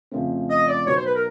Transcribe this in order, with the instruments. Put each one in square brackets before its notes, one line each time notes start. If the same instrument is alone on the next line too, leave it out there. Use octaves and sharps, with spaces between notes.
[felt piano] F2 C#3 F3 A3 C4
[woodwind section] D#5
D5
[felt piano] B1 B2 F#3 B3 [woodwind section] C#5
[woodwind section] C5
B4
A#4